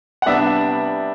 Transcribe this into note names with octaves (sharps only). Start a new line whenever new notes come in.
F#5
C3 G3 B3 D4 E5